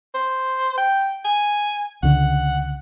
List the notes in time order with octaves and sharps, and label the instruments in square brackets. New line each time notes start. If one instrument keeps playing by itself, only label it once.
[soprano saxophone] C5
G5
G#5
[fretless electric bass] C#2 D3 [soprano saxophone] F#5